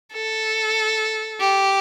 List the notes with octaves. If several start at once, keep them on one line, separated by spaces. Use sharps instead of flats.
A4
G4